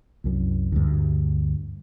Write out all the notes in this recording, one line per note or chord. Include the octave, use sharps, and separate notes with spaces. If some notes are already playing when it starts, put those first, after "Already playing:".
C2 F#2
D2 G2